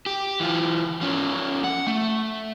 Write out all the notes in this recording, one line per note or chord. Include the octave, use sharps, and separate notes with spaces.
G4
E3 F4
F3 C#4
F#5
A3